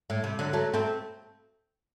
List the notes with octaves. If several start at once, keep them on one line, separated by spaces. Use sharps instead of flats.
A2
C3
D3 F#3
F#3 A3
A3 C4